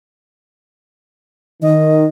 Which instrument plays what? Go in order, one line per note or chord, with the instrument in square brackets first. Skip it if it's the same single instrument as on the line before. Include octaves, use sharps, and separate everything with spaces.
[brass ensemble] D#3 [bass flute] D#5